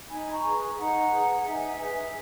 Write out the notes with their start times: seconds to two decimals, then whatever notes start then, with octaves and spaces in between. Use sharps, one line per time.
0.09 D#4 G#5 B5
0.32 A#5 C#6
0.43 G#4 B4
0.76 D#4 F#5 A#5
1.11 G#4 B4
1.45 D#4 E5 G#5
1.78 G#4 B4 E5 G#5